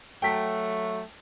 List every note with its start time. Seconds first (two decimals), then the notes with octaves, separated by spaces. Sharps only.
0.22 F#3 A3 G5 A5 B6